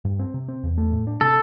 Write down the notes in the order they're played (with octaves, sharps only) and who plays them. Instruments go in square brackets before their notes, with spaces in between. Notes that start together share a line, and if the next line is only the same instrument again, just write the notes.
[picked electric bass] G2
C4
C3
C4
E2
A3
A2
D4
[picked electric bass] C3 [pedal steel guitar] A4